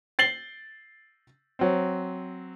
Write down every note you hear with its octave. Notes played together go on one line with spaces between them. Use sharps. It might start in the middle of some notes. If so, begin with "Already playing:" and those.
A6 C7 F#7 G7
F#3 C4